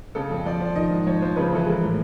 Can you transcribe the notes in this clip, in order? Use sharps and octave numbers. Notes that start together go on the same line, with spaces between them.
C#3 A4
F2
F3 D5
F3
D#3 D#5
G#2
F3 C#5
F3 C5
C#3 B4
E3 A4
G#3 A#4
A2